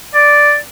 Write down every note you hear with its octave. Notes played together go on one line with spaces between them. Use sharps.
D5